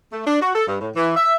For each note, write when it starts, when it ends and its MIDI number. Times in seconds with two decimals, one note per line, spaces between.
0.12 0.22 57
0.26 0.38 62
0.42 0.50 66
0.55 0.63 69
0.68 0.78 43
0.81 0.90 45
0.96 1.16 52
1.16 1.36 76